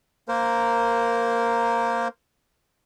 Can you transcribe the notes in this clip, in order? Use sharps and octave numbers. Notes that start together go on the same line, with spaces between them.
A#3 A#4 C5